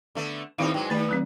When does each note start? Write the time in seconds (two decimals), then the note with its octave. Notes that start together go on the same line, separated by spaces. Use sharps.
0.15 D3 A3 B3
0.58 D#2 A2 C4 D#4 E4 F5
0.74 G#2 F#3 G#3 G5
0.90 D#2 A3 B4 D5
1.09 D#3 F#3 C4